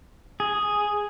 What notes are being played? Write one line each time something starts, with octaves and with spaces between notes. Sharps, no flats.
G#4